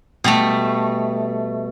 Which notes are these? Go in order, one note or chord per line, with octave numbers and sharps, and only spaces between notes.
B2 G3 A3